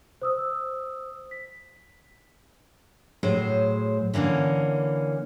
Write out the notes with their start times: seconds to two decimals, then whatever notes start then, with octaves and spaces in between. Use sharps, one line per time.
0.22 C5 D#6 E6
1.31 B6
3.23 A2 F#3 G#4 C5
4.14 D3 E3 A#3 C#4